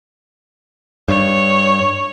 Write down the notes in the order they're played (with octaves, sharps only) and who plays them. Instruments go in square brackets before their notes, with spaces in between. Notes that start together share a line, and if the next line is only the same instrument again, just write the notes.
[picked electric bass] G2 [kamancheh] C#5